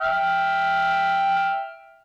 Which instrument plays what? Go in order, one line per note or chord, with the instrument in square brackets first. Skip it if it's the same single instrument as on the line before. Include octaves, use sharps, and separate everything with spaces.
[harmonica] E5 G5 F6